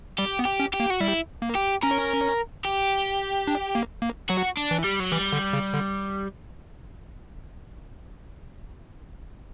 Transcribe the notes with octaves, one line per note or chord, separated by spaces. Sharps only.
G3 G4
B3
G4
C#4
G4
A#3
F#4
G3 E4
A#3
G4
C#4 A#4
G4
D4
A#3
A#3
F#3 F#4
D4
E3
G3
F#3
E3 G3
D3
C#3
D3